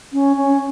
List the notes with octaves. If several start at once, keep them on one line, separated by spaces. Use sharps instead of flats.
C#4
C#4